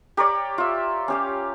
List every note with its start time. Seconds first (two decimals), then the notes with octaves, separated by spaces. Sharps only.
0.17 G4 A#4 C#5 D5
0.58 F4 E5
1.08 C#4 G4 F5